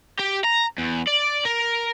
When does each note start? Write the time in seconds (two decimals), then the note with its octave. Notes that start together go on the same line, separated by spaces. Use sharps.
0.19 G4
0.44 A#5
0.78 E2
1.08 D5
1.45 A#4